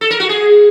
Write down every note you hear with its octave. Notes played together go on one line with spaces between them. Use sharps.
A4
A#4
F#4
G#4